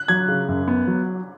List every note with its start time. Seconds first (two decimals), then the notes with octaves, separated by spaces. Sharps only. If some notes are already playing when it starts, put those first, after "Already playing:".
Already playing: F#6
0.08 F#3 G#6
0.28 C#3
0.49 F#2
0.67 B3
0.87 F#3